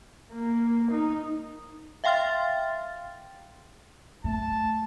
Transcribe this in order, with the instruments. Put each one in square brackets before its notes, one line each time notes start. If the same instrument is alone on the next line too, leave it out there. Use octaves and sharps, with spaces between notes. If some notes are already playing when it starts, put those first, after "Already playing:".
[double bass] A#3
D#4
[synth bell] E5 F5 G5 C6 F6 A6
[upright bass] A3 [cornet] A5